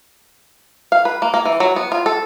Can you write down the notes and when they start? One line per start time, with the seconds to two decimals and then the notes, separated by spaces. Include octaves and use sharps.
0.92 F5
1.05 B4
1.22 A#3
1.34 A#3
1.45 E3
1.60 F#3
1.76 B3
1.92 F4
2.06 A4